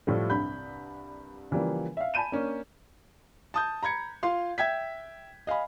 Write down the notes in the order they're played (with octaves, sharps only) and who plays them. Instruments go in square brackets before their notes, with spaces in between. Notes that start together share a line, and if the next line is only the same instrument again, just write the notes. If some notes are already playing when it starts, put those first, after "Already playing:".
[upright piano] A2 F3 G3 A3
C2 G2 B5 G6
C#3 E3 F3 G3 A#3
E5 F5
G#5 A5 B5 G6 D#7 E7
A#3 C#4 D4
[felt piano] A5 D#6 G6
A#5 B5 G#6 C#7
F4 F5 C6
E5 G5 G#6 B6
D#5 F5 G#5 B5